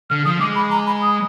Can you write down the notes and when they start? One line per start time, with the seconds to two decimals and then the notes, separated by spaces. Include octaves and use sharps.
0.10 D3 F6
0.25 F3 D#6
0.40 G#3 D6
0.55 B5
0.71 A#5
0.87 B5
1.02 D#6